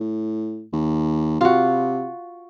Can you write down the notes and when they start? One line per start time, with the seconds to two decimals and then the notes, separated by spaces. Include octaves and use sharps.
0.01 A2
0.73 D#2
1.41 C3 F4 F#4